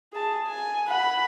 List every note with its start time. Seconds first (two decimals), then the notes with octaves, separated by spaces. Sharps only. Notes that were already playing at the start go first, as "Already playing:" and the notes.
0.13 G#4 A5
0.48 G#5
0.88 F#5 B5